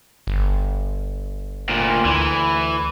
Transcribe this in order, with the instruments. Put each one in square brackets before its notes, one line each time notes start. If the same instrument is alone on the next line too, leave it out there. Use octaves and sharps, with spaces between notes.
[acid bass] G1
[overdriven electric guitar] D2 A#2
[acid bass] D2 [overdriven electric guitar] E3